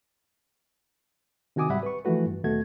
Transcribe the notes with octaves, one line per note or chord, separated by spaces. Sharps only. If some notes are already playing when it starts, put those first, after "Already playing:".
C3 D#3 F#4 G#5 D6 D#6
C2 G#2 G3 E5 F#5 B5
B4 C#6
E3 F3 A3 F#4 B4
G2
D#2 B2 A3 F#4 G#6